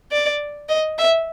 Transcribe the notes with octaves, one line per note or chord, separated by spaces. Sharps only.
D5
D#5
E5